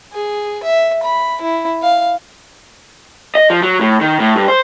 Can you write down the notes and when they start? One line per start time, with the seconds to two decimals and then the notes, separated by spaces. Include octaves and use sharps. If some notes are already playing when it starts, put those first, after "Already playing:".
0.13 G#4
0.63 E5
1.03 B5
1.41 E4
1.82 F5
3.35 D#5
3.50 F3
3.63 F#3
3.81 A2
4.01 D#3
4.20 A2
4.36 G2
4.48 C5